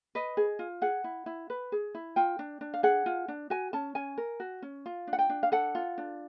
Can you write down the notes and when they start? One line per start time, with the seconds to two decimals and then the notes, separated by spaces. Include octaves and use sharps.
0.15 B4 D#5
0.37 G#4
0.59 F4
0.82 G#4 F#5
1.04 E4
1.26 E4
1.50 B4
1.72 G#4
1.95 E4
2.16 F4 G5
2.39 D4
2.61 D4
2.74 F5
2.83 G#4 F#5
3.06 F4
3.28 D4
3.50 F#4 G#5
3.73 C#4 A5
3.95 C#4 G#5
4.18 A#4
4.40 F#4
4.62 C#4
4.86 F4
5.07 D4
5.13 F#5
5.19 G5
5.29 D4
5.43 F5
5.52 A4 F#5
5.75 F4
5.98 D4